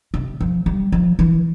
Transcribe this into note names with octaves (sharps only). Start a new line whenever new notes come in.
C3
F3
G3
F3
E3